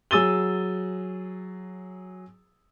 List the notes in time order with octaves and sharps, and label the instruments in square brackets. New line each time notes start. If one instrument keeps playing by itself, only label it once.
[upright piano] F#3 G#4 E6 A6 D#7 G7